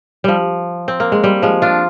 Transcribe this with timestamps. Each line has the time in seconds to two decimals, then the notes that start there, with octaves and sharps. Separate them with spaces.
0.24 F3 G3
0.88 C4
1.00 A#3
1.12 G#3
1.24 G3
1.42 F3 G#3
1.62 D4 F4